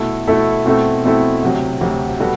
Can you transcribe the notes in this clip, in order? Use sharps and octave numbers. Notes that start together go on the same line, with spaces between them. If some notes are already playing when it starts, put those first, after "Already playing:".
Already playing: B2 A3 E4 A4
B2 A3 E4 A4
B2 A3 C4 E4 A4
B2 A3 C4 E4 A4
D2 C3 F#3
D2 C3 F#3
B2 G3 B3 F#4 A4